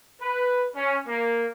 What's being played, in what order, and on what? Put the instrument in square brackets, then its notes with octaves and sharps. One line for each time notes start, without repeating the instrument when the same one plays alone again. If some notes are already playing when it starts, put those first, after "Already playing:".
[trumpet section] B4
C#4
A#3